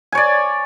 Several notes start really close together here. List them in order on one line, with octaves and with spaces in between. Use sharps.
G#5 C#5 D5